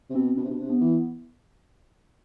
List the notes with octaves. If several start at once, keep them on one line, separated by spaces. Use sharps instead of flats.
C3
B2 C4
B2 D4
C3
B2
C3
B3
E3